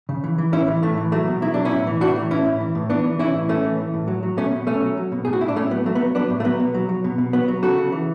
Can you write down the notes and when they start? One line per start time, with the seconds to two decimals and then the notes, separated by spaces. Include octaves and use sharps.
0.09 C#3
0.24 E3
0.38 E3
0.53 A2 C#4 E4
0.68 E3
0.82 A2 A3
0.97 E3
1.12 F#3 A3
1.27 B2
1.42 F#3 E4
1.54 B2 D4
1.65 C#4 E4
1.71 A2
1.87 E3
2.01 A2 D4 F#4
2.16 E3
2.30 A2 C#4 E4
2.45 A2
2.60 E3
2.75 A2
2.90 E3 B3 D4
3.05 E3
3.19 E3 C#4 E4
3.34 A2
3.48 A2 A3 C#4
3.64 E3
3.78 E3
3.94 A2
4.08 F#3
4.23 F#3
4.37 B2 A3 C#4
4.52 B2
4.67 B2 A3 C#4
4.82 F#3
4.97 F#3
5.12 B2
5.25 A2 G#4
5.33 F#4
5.41 A2 E4
5.48 D4
5.56 A2 A3 C#4
5.71 F#3 B3
5.85 F#3 A3
5.95 B3
6.01 F#3
6.15 F#3 B3 D4
6.30 A2
6.40 A3
6.44 F#3 B3
6.60 B2
6.74 F#3
6.89 F#3
7.04 B2
7.18 B2
7.33 F#3 B3
7.48 F#3
7.63 C#3 F#4 A4
7.78 C#3
7.92 E3